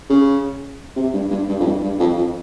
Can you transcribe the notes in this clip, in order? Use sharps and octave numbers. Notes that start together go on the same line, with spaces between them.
C#3
C3
G2
G2
G2
F2
G2
G2
F2
F2